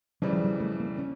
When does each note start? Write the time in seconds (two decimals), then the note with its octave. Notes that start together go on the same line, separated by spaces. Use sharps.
0.22 F2 C#3 E3 F#3 G3
0.33 F3
0.44 F#3
0.60 A3
0.80 A#3
0.99 C#4